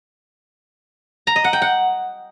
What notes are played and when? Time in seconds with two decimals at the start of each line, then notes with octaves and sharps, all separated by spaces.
1.27 A#5
1.36 D#5
1.44 F#5
1.53 G5
1.62 F#5